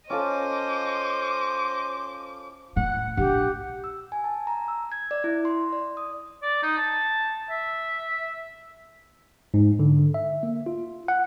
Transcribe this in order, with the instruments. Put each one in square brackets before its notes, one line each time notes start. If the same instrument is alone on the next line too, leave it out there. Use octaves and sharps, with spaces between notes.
[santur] C#4 F4 A4 [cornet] C5 [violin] D#5 [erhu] D6
[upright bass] A2 [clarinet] F#5
[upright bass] A#1 D4 [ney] G4 [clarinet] F#5
[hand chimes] E6
G#5
A5
A#5
E6
G#6
D5
E4
C6
D5
D#6
[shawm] D5
D#4
A5
E5
[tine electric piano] G#2
D3
E5
A#3
F4
F#5